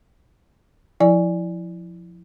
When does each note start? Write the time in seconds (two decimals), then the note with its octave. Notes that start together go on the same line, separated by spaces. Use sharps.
1.00 F3 E4 D5 G#5